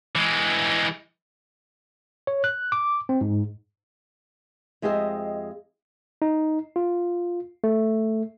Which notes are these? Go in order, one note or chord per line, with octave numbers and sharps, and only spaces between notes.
E3 G#3
C#5
F#6
D6
C4
G#2
F2 G#3 G4 C5 D#5 E5
D#4
F4
A3